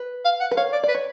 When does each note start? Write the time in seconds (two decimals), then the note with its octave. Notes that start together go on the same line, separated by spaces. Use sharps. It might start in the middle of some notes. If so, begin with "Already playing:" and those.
Already playing: B4
0.25 F5
0.41 F#5
0.51 B4
0.57 C#5 F5
0.73 D5
0.83 D5
0.89 B4
0.94 C#5